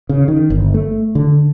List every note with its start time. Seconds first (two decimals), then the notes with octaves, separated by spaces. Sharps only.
0.09 C#3
0.28 D#3
0.50 G1
0.74 A3
1.15 D3